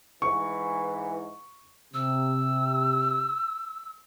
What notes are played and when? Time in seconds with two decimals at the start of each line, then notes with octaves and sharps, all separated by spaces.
0.22 G#2 E3 C#6
1.94 C3 E6